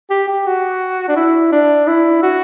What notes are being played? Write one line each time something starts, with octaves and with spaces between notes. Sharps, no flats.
G4
G4
F#4
D4
E4
D4
E4
F#4